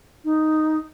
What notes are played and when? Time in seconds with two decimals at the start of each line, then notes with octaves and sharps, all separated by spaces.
0.24 D#4